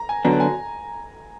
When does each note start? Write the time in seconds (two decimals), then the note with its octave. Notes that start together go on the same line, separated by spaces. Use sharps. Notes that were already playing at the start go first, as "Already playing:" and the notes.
Already playing: A#5
0.09 G#5
0.25 D3 F#3 B3 D4 A#5
0.40 G#5